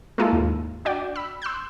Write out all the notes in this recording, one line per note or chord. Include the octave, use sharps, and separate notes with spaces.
G#3 A#3 E4 F4 A4
D#2 G#2
D4 F#4 D5 G5
B5 E6
C6 E6 F#6 G6